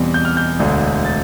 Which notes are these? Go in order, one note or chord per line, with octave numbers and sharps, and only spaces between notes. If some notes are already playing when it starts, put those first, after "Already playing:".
Already playing: E2 B2 G3 C4
G6
F6
G6
E1 D2 D3
A6